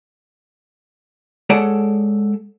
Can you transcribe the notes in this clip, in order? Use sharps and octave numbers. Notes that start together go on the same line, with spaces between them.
G#3 A4 C#5 D5 F#5 A5